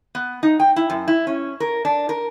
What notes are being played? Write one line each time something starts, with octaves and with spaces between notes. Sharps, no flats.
B3
D#4
G5
E4
F#2
E4
C#4
A#4
D4
A#4